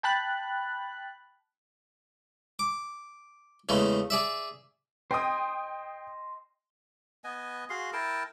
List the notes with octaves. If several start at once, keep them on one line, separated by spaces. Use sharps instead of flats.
G5 A5 B5 F#6
D6
E2 C#3 G#3 A3
G#4 D5 E5
C5 D#5 G5 G#5 D#6
B3 B4 D#5 G#5
F#4 G#4 F5 C6
E4 A#4 G5 A5